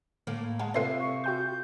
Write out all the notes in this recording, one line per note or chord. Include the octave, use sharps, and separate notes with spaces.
A2 D3 A#3
G#3 F#5 A5
C3 F4 A4 B4 C#5 E5 C7
C#6
F#4 G5 C6 G6